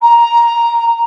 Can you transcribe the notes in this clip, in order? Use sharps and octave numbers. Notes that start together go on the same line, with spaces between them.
A#5